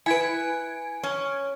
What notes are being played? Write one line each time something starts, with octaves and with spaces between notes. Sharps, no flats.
E4 B4 G#5 G#6 D7
C#4